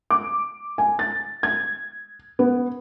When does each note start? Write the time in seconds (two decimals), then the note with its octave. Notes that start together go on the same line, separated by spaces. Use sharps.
0.10 D6
0.78 G#5
0.99 A6
1.43 G#6
2.39 B3